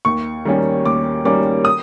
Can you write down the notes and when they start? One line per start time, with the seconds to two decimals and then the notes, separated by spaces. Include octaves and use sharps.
0.05 D#2 C#6
0.45 D#3 G3 A#3 C#4
0.85 D#2 D6
1.25 D#3 G3 A#3 C#4 D6
1.65 D#6